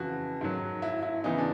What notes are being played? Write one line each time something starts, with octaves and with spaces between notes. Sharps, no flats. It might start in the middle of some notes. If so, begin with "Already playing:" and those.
Already playing: F2 C#3 E3 F#4
G#2 D#3 F#3
E4
E4
E2 C#3 E3 D#4
D4